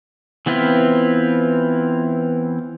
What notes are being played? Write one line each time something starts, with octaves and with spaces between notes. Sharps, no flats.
E3 B3 C4 E4 F4